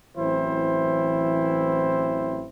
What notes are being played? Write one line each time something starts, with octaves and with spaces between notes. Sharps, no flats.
A1 E3 F#3 C4 E4 C5